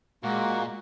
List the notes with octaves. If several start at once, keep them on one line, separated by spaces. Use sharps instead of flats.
A#2 G#3 A#3 F#4